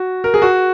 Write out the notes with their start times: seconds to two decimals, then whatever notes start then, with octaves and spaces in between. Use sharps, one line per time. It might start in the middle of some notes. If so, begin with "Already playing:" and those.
Already playing: F#4
0.24 A#4
0.34 G#4
0.42 F#4